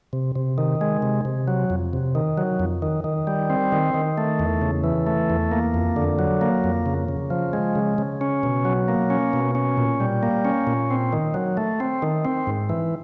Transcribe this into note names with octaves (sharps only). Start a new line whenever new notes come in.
C3
C3
D#3
G#3
C3
C3
F#3
F2
C3
D#3
F#3
F2
D#3
D#3
G3
C4
D#3
D#3
A3
E2
C#3
E3
A3
E2
A#3
F2
D3
F#3
A#3
F2
C#3
C#3
F3
G#3
C#3
C#3
C#4
B2
F#3
A#3
C#4
B2
C#4
A#2
G3
A#3
C#4
A#2
C4
D#3
F#3
A3
C4
D#3
C4
G#2
E3